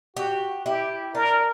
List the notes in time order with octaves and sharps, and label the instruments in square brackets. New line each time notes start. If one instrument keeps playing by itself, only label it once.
[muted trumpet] F#4 [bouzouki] G4
[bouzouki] E4 [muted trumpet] G4
[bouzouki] D4 [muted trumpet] A#4